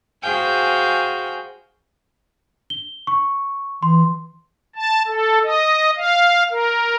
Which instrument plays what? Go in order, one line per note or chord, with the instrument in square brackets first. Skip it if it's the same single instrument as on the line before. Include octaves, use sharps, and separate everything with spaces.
[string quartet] F#4 G#4 C5 F5 G5 G#5
[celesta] G7
C#6
[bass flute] E3 [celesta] C6
[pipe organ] A5
A4
D#5
F5
A#4